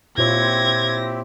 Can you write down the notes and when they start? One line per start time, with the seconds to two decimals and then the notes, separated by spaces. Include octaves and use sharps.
0.18 A#2 C4 E4 F4 G4 C#5 G#6 A#6